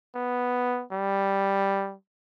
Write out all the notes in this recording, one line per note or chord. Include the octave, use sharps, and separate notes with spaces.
B3
G3